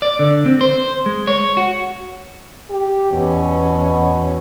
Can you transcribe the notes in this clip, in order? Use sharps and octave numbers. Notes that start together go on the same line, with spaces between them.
D5
D3
C4
C5
G#3
C#5
F#4
G4
E2 B2 C#4